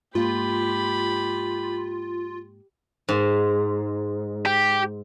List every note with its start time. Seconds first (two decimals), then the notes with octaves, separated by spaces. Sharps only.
0.15 G#2 A#3 F4 G4 B5
3.09 G#2
4.46 G4